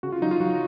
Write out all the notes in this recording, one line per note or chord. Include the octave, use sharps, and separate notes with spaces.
C#3 F#4
F4
F#3 D#4
F4
F#3 F#4